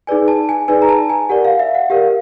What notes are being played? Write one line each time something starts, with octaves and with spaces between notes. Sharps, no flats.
D#4 G#4 B4 D5 G#5
A5
G#5
D#4 G#4 B4 D5 G#5
A#5
A5
G#5
G4 A#4 D5 F#5
F5
E5
F#5
G4 A#4 D5 F5